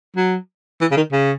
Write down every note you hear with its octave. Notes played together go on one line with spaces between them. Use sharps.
F#3
E3
C#3
D#3
C#3